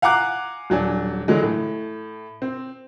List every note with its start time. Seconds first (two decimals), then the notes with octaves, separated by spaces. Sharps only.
0.02 F5 F#5 G#5 A#5 D6 F#6
0.70 D#1 F#3 D4 G#5
1.28 D3 E3 F#3 G#3
1.43 A2
2.42 C4